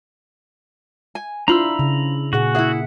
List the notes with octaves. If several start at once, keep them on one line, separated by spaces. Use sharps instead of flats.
G#5
D4 E4 F4 C5 A#5 B5 E6
C#3
A#2 F#4 G#4 F#5
E4 G#4 E5 F#5